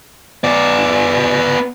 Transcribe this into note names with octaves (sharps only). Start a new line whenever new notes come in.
B3 D5